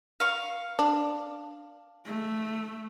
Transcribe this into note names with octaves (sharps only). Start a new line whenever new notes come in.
F5 C#6
D4
A3